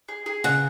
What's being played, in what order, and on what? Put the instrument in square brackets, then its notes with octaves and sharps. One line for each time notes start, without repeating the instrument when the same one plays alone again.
[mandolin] G#4
G#4
[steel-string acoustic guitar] C#3 [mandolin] F#5